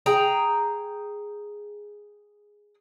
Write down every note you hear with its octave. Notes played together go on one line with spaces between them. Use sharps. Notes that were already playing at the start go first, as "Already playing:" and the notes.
G#4 G5 A#5